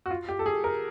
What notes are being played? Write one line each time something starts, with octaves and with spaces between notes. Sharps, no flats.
F#4
F4
G4
A4
G#4
A#4